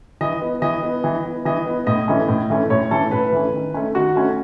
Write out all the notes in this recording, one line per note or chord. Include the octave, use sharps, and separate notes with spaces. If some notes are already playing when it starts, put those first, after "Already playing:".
E3 D#5
B3
E3 D#5
B3
E3
B3
E3 D#5
B3
A2 D#5
E3 A3 C#4
A2
E3 A3 C#4
A2 C#5
E3 A3 C#4 A4
A2 B4
E3 A3 C#4
D#3
A3 C#4
D#3 F#4
A3 C#4